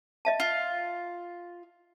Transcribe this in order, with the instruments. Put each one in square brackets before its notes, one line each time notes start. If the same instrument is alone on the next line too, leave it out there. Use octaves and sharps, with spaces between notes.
[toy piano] D#5 E5 A5
[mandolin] F4